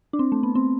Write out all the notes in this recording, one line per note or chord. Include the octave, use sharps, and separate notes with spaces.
D4
C4
A3
B3
C4